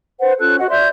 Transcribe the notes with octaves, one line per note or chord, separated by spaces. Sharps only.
B4 C5 F#5
C#4 F4 A4 F#6
F#4 D#5 F#5
D5 E5 C6 G6